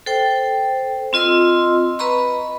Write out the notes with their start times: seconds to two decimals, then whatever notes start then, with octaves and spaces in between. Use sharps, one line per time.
0.06 A4 C5 G5
1.13 C4 F4 D#5 C6 E6
1.99 B4 D#5 A#5 B5 C#6